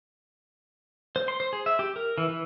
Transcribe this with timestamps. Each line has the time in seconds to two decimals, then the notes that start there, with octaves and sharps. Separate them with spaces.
1.16 C5
1.28 C6
1.40 C5
1.53 G#4
1.66 E5
1.79 G4
1.96 A#4
2.18 E3
2.29 E3